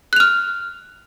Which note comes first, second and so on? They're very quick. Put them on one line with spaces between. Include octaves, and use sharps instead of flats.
F#6 F7 F6